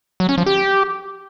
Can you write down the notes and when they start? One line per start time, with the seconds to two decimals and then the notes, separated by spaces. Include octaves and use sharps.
0.20 F#3
0.29 C#4
0.38 F3
0.46 G4